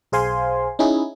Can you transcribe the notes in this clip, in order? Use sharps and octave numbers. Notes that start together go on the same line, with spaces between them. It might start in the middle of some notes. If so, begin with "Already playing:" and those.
B1 G#4 C5 F5 G#5 C6
C#4 D#4 E4 G#4